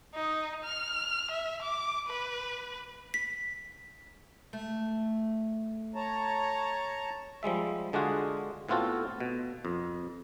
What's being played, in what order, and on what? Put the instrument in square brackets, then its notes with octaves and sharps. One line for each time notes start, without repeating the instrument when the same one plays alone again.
[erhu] D#4
F6
E5
D6
B4
[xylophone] B6
[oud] A3
[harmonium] C#5 A5 A#5
[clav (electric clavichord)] F3 G3 G#3 E5
D3 G#3 D4 F4 F#4 G#4
A2 B3 C4 F4 F#4 A4
B2
F2